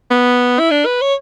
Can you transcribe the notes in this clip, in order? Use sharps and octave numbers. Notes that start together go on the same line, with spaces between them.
B3
E4
D4
B4
C#5